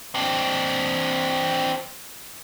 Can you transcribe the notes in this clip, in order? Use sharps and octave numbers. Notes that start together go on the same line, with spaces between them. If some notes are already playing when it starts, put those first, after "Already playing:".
C4 D4